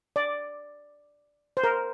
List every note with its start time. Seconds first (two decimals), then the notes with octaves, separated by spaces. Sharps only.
0.16 D5
1.57 C5
1.64 A#4